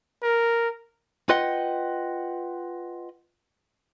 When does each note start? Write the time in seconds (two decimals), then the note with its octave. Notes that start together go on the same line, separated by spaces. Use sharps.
0.23 A#4
1.29 F4 B4 D#5 F#5 G5